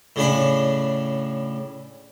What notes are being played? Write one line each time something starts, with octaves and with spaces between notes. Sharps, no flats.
A2 C#3 D4 B5